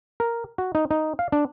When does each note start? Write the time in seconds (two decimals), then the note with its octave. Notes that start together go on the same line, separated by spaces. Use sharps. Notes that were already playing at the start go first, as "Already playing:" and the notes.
0.20 A#4
0.58 F#4
0.75 D#4
0.91 D#4
1.19 F5
1.32 D4